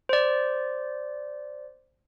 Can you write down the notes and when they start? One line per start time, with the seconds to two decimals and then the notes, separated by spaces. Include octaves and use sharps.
0.09 C5 D5